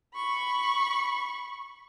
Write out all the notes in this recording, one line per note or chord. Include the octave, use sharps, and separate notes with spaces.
B5 C#6